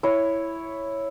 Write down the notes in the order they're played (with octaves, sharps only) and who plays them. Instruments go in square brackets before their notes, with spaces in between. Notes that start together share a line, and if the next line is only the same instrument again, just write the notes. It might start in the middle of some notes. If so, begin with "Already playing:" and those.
[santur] E4 C#5